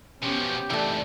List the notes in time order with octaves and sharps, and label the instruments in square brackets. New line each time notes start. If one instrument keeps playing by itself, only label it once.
[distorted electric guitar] B2 F3 [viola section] B3 C#4 [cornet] G4
[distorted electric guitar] C2 G#2 [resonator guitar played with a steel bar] E3 A3 [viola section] D5